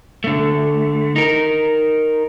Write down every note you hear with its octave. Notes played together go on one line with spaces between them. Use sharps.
D3 A3
D#4 A#4